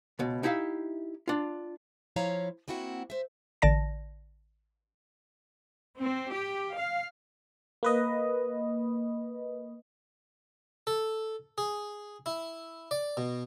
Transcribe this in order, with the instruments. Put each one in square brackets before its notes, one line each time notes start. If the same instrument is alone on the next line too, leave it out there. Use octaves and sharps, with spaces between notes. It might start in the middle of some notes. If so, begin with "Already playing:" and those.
[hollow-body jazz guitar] C#2 B2
D#4 E4 G4 E5 F5
D4 F4
[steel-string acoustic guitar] F3 E4 C#5 F5 A#5
A#3 C4 E4 F#4 F#5
C5 E5
[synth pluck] A1 D3 D5 A5 A#6
[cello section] C4
G4
F5
[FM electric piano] A#3 B4 D#5
[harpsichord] A4
G#4
E4
D5
B2